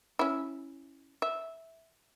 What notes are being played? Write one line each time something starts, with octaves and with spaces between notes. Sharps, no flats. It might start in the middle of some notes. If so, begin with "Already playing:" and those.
C#4 E4
E5